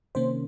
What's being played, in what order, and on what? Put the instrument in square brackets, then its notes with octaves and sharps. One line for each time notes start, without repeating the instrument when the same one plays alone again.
[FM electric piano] C3 D#3 A#3 C#4 C5